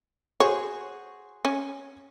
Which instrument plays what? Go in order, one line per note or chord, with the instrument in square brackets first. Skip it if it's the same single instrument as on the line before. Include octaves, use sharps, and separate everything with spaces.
[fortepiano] F#4 G#4 C5 [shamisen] C#5
[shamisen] C#4